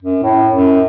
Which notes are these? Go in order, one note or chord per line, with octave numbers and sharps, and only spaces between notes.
F#2
A2
F#2